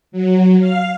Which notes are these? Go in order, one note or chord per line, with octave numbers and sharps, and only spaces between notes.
F#3
F5